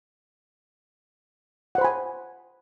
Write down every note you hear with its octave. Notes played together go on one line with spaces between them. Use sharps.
C5 F#5 G#5 B5